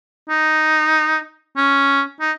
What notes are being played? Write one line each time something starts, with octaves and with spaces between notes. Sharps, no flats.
D#4
C#4
D#4